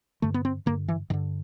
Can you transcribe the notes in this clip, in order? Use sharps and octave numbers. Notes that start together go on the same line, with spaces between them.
G2 D3 A3
B3
C4
G2 D3 A#3
E3
G2 D3 D#3